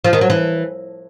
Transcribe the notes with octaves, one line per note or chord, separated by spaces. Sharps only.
F3
D#3
F#3
E3